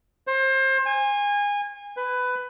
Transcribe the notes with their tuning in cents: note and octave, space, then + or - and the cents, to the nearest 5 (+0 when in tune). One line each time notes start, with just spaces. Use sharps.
C5 +30
G#5 -25
B4 +15